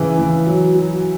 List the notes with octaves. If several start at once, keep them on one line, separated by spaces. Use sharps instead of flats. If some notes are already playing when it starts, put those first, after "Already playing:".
Already playing: C#3 E3
E3
F#3
F#3